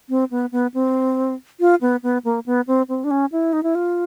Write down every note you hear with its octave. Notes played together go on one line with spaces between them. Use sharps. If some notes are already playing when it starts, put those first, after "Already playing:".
C4
B3
B3
C4
F4
B3
B3
A#3
B3
C4
C4
D4
C#4
E4
D#4
E4
F4